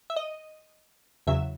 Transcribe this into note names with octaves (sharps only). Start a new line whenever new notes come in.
E5
D#5
E2 C#3 F#3 E5